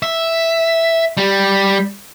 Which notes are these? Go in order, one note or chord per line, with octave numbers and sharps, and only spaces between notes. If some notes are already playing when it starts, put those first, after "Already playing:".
E5
G3